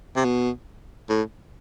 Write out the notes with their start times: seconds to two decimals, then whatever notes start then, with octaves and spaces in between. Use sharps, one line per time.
0.16 C3
0.25 B2
1.09 A2